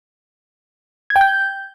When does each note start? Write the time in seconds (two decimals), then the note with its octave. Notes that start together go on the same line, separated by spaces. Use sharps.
1.10 G#6
1.16 G5
1.21 G6